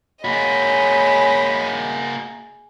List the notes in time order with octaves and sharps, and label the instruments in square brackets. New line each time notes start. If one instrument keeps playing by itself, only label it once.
[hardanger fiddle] G#3 D#5 [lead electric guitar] A#3 F#4 [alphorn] C#5 [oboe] B5